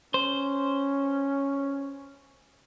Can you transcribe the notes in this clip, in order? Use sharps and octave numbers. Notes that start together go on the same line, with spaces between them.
C#4 C5